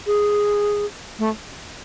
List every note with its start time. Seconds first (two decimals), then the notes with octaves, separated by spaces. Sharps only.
0.07 G#4
1.19 A3